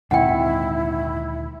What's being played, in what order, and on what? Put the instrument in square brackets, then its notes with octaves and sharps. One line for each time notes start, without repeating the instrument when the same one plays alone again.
[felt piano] G#1 [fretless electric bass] D2 A#2 D#3 [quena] E4 [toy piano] F#5 G5